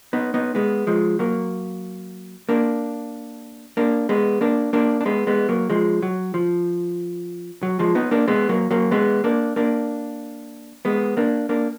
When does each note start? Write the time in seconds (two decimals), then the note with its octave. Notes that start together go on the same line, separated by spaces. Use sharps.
0.13 B3 D#4
0.34 B3 D#4
0.55 G#3 B3
0.87 F3 G#3
1.19 F#3 A#3
2.49 A#3 D4
3.77 A#3 D4
4.09 G#3 B3
4.41 A#3 D4
4.73 A#3 D4
5.01 D4
5.06 G#3 B3
5.27 G#3 B3
5.49 F#3 A#3
5.70 F3 G#3
6.03 F#3
6.34 F3
7.63 F#3
7.79 F3 G#3
7.95 B3 D#4
8.11 A#3 D4
8.28 G#3 B3
8.49 F#3 A#3
8.71 F#3 A#3
8.91 G#3 B3
9.24 A#3 D4
9.56 A#3 D4
10.85 G#3 B3
11.17 A#3 D4
11.49 A#3 D4